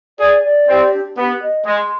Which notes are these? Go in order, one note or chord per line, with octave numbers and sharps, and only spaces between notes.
G#4 D5
D5
C4 G4
D4
B3 G4
D#5
G#3 C6